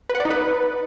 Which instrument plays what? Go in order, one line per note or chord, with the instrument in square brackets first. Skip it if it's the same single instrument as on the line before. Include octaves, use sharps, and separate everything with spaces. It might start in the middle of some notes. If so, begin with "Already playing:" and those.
[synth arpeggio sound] B4
F#5
D5
D#4
B4